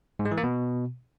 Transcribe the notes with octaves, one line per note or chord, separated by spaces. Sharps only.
G#2
G#3
E3
A#3
B2